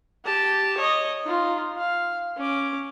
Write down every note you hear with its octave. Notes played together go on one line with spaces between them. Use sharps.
G4 A5
C#5 D#5
D#4 F4
F5
C#4 D6